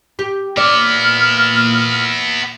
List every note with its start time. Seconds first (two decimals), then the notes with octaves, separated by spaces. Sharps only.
0.19 G4
0.57 A#2 B3 E4 D5 F6